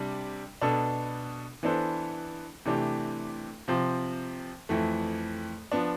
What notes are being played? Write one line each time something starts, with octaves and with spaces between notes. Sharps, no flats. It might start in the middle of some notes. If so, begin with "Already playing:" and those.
Already playing: C3 G3 D4
B2 B3 D4 A4
E3 B3 D4 A4 C5
C3 E3 A3 D4 G4
C3 F3 C4
F2 E3 A3
F3 B3 D4